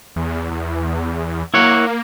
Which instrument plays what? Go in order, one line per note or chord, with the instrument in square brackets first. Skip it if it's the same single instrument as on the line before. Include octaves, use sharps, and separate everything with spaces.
[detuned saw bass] E2
E2
[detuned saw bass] A#3 [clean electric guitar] E4 C#5 F#5